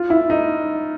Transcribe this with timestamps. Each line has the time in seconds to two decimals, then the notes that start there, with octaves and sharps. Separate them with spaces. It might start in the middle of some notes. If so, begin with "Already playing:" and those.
Already playing: F4
0.10 E4
0.30 D#4